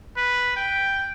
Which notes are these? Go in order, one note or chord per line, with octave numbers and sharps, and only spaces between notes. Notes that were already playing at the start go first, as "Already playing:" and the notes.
B4
G5